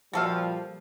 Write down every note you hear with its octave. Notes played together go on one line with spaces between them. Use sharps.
A#2 F3 G3 F#4 A4 F5